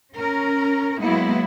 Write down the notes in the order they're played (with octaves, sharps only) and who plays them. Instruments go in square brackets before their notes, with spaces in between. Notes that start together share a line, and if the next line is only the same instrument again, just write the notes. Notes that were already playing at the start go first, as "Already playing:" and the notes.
[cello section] C#4 A#4
F#3 G#3 A#3 B3 E4